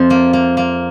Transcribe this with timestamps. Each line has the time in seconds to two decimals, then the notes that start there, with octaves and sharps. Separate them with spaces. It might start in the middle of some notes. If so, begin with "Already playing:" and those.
Already playing: F2 F3 C4
0.10 A#3
0.33 A#3
0.57 A#3